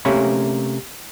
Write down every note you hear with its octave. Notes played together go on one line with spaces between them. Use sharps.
C3 A3 A#3 C#4 B5